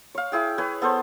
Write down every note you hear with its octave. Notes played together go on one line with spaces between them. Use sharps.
C#5 F5
E4 G#4 G5
B4 C#5 G#5
B3 A4 C5